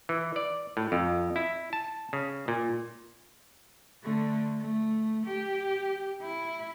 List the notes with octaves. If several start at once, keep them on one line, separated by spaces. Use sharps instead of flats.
E3
D5
A2
F2
E4
A5
C#3
A#2
D3 A3
A3
G4
E4